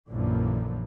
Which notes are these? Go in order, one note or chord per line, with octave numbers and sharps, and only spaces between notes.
A#1 F#2 D3 E3 F3 A#3